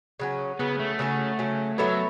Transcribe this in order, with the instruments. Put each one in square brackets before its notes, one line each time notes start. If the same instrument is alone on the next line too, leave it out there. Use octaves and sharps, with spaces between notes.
[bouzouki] C#3 F#3 C#4
[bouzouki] C#3 F#3 C#4 [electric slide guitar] B3
[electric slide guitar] A3
[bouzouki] C#3 F#3 C#4
C#3 F#3 C#4
[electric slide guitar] F#3 [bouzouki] B3 A4 C#5 E5